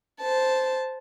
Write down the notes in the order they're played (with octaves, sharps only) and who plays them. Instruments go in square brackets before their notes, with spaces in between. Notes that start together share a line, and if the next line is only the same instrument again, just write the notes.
[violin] C5 A5